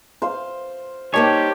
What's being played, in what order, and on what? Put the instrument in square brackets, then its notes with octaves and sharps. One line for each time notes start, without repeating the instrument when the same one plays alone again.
[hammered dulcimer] C5 F5
[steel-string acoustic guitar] G3 A#3 D#4 [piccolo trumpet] G4 [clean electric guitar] C#5 [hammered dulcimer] A5